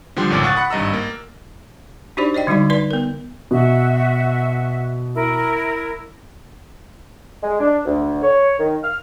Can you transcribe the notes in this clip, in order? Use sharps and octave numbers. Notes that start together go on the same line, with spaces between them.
D3 F3 G3 G5 C6
G#1 C#2 A#2 C#4 D6
F#5 C#6 D#6 F#6 A6
F#5 B5 F#6 C#7
G#1 G2 D#5 A#5 E6
A#3
D4 D#4 F#4 G4 C5 D5
C5 D5 D#5 G5
D3 G3 G#3 D#4 F#4 D5
D#4 B4 D5 C6
B3 A#4
B2 F#4 E5
E4 A#4
G#3
D4
D2
C#5
D#3
F6